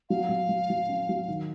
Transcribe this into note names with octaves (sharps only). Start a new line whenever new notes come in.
F#3 F5
F#3
F#3
F#3
C#4
F#3
D#3